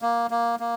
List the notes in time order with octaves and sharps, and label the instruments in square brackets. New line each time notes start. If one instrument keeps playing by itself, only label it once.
[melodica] A#3
A#3
A#3